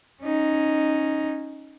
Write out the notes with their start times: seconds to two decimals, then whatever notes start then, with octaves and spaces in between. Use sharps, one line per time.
0.22 C#4 D#4